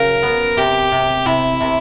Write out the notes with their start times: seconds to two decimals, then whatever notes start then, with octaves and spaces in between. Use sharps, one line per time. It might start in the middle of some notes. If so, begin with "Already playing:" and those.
Already playing: C#3 F#3 A#4
0.23 B3
0.57 C3 G4
0.92 C3
1.26 C3 E4
1.61 C3